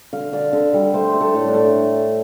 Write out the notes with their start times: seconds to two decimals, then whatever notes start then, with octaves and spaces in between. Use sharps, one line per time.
0.13 D3 F5
0.33 D3 D5
0.53 D3 A4
0.74 G3 A4
0.94 A3 C5
1.14 A3
1.21 A4
1.35 A2
1.47 D4
1.54 A3